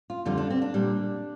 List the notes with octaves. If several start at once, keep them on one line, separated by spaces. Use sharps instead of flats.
F4
F2 D3 G3 F4
D4
C4
D4
A#2 G3